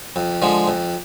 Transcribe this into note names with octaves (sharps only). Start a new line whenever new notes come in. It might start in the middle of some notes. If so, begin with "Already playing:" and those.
F2
D3 F3 G#3
F2